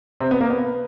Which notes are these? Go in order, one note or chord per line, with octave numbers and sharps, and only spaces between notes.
C3 C4
B3
A#3
B3